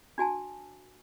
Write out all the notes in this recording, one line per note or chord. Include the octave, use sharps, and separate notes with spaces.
D4 F#4 G#5 A5